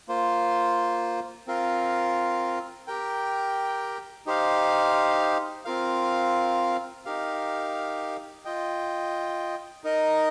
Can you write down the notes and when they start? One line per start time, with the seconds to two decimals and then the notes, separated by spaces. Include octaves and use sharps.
0.08 A#3 F4 C5
1.47 C4 F4 A#4 F5
2.87 G4 A#4 G5
4.26 D#4 G4 C5 F5
5.65 C4 F4 A#4 F5
7.05 D#4 G4 A#4 F5
8.45 F4 D#5 G5
9.84 D#4 A#4 D#5